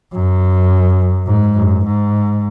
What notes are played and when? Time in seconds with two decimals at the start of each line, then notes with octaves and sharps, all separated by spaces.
0.13 F#2
1.27 G#2
1.56 F#2
1.84 G#2